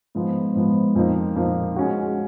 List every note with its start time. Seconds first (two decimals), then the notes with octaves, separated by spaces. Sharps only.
0.15 G#2 F3 B3
0.55 G#2 F3 B3
0.95 F2 F3 A#3 D#4
1.36 F2 F3 A#3 D#4
1.76 G#3 C#4 F#4